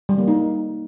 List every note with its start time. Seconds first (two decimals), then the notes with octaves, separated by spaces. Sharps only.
0.09 G3
0.18 A#3
0.28 D#4